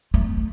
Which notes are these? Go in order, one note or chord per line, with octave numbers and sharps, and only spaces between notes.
A3